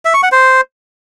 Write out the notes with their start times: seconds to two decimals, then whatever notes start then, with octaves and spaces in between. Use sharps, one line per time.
0.05 E5
0.14 C#6
0.23 F#5
0.32 C5